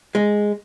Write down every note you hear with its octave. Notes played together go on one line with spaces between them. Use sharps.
G#3